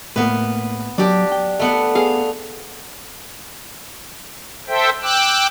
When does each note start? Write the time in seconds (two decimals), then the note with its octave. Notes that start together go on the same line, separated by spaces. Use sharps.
0.16 A2 A#3 B3 B4
0.98 F#3 D4 G4
1.32 G5
1.59 A3 B3 F#5
1.95 B3 G#4 F5
4.68 A4 C5 E5 G5
5.02 G5 D6 E6 F#6